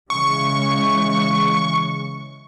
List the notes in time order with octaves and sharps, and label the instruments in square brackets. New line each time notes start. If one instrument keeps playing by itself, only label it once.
[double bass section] C#3 E3 G#3 [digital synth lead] C#6